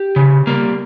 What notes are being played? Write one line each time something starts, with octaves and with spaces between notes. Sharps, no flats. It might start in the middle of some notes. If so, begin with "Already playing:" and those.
Already playing: G4
C#3
G3 A#3